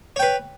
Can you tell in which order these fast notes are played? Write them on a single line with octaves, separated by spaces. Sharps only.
C#5 G5 B4